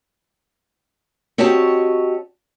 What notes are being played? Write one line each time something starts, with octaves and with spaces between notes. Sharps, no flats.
C4 F#4 G4 C#5 D#5 A5